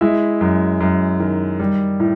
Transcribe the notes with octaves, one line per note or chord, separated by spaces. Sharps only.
G#3 E4 E5
F#2
F#2
D#3
G3
A2